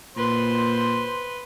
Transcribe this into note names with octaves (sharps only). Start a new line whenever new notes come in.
A#2 B4 C5 C6